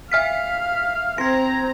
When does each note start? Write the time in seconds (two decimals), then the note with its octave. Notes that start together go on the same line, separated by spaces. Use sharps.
0.12 E5 F5 F6 B6
1.18 C4 C5 A#5 G#6 A#6